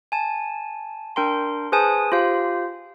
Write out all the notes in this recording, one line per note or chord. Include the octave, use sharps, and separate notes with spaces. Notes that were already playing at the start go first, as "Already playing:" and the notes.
G#5 A5
D4 A#4 G5 A#5 C6
G#4 B4 C5 G#5 A5 D#6
F4 G4 C5 F5